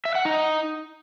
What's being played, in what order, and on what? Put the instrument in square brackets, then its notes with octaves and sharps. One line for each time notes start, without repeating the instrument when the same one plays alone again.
[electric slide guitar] E5
F#5
D#4